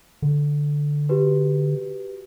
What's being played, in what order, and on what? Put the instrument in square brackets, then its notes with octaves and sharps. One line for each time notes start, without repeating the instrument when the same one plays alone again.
[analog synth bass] D3
[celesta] F#4 G4 B4